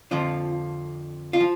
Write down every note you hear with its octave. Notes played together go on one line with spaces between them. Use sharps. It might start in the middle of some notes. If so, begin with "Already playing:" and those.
F2 D3 F3 F4
F4
F3